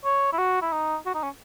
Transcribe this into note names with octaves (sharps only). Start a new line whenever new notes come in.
C#5
E4
F#4
E4
D#4
F#4
D#4
C#4